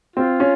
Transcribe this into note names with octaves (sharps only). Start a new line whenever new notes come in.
C4 F4
C#4